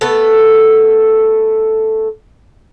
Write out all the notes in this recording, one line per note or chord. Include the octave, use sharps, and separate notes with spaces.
A3 B3 A4